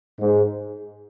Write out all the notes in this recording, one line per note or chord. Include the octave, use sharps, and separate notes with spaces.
G#2